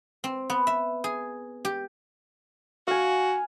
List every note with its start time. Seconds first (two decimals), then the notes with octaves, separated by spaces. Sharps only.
0.24 C4
0.50 B3
0.67 E5
1.04 G#4
1.65 G4
2.87 F#4 F5 G#5